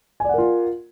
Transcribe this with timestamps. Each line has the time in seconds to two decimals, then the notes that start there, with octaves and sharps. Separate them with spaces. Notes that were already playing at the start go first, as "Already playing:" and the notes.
0.20 G#5
0.25 D5
0.29 F#5
0.34 A#4
0.38 F4